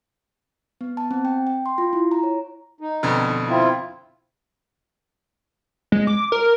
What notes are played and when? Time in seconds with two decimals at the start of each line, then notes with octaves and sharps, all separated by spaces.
0.81 B3
0.97 A5
1.11 C4
1.25 G5
1.47 G5
1.66 C6
1.78 F4
1.93 E4
2.11 A#5
2.23 C#5
2.80 D#4
3.03 F2 B2 D3
3.48 C4 E4 F4
5.92 G#3
6.07 D6
6.32 A#4